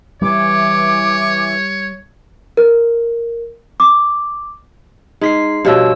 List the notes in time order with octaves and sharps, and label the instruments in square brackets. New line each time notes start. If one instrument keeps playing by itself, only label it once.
[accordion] E3 [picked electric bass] G3 [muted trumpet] C#5 [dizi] D6
[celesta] A#4
D6
[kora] G#3 [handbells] D#4 B6 C7
[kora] G2 B2 F3 [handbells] D4 C#5 E6